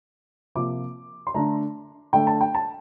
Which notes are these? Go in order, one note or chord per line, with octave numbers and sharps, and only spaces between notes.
C3 F3 A#3 D6
C6
D3 A3 A#5
D3 A3 G5
A5
G5
A5